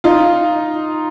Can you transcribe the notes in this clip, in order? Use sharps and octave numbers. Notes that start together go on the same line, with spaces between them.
D#4 F4